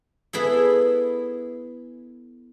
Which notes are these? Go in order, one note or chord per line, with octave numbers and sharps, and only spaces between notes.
B3 E4 G#4 A4